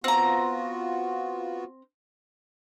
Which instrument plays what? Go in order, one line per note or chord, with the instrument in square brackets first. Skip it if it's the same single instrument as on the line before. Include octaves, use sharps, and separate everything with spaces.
[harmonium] B3 F4 F#4 [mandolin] C4 A#5